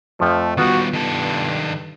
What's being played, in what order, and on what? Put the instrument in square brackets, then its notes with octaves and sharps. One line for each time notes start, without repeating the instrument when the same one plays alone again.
[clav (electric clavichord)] F2 F3 [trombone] A3
[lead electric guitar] D#3 G3 [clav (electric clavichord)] B3 F4 [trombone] F#4
[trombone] G2 [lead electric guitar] D#3 A4